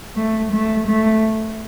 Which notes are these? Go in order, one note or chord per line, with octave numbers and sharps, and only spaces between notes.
A3
A3
A3